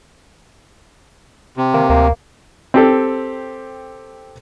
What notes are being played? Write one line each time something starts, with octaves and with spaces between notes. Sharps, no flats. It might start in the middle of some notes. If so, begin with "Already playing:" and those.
C3
D#3 A#3
D2 A#3
C4 G4 A4